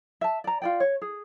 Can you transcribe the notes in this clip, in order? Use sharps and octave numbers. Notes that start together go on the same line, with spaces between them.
E5 A5
D5 A#5
F4 D5 G5
C#5
G#4